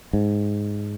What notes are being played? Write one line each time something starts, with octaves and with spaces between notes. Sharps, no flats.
G#2